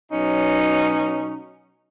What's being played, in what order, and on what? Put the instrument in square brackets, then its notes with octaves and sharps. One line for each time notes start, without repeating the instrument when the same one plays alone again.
[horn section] B2 F#3 C#4 D#4